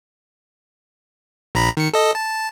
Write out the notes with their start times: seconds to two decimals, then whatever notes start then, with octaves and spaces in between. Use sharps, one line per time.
1.55 A#1 A#5 B5
1.77 D#3 C#7
1.93 A4 D#5
2.15 A5